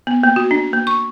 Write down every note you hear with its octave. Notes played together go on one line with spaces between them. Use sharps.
B3
A#3
F#4
D4
A#3
C#6